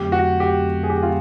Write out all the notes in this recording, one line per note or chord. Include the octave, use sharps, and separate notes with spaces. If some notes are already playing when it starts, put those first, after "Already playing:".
Already playing: F2 D3 F#3 A3 C4 G4
F#4
G4
G#4
G4
F4